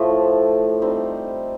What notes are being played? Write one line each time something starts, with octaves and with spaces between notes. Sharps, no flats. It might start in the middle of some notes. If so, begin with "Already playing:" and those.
Already playing: A2 F3 A3
G3 C4 D#4